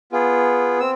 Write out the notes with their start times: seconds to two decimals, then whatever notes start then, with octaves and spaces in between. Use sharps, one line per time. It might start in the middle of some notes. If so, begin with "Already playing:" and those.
0.12 B3 F4 G#4
0.80 C4 E6